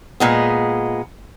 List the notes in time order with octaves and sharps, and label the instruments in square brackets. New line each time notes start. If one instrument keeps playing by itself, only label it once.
[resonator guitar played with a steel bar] A#2 G#3 B3